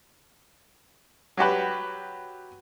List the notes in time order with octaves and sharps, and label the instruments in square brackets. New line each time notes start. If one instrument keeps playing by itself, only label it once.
[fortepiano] F#3 F#4 G4 B4